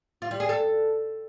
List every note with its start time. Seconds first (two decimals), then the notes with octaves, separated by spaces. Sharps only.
0.22 F4
0.31 G3
0.40 G#4
0.49 A4